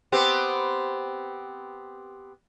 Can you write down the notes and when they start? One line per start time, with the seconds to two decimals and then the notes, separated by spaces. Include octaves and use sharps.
0.12 B3 C4 G4